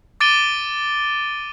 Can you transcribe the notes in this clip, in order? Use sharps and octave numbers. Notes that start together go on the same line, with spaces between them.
D6 A6 D7 D#7 G7